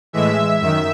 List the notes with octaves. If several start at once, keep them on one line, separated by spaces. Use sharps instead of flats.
A2 E3 G#3 E5
F#2 D#3 E5